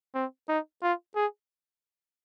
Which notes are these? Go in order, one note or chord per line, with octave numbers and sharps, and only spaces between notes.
C4
D#4
F4
G#4